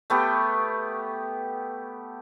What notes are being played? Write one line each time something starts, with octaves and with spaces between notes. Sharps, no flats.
A3 B3 G4